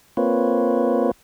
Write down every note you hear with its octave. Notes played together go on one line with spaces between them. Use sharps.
A#3 C4 F4 B4 C#5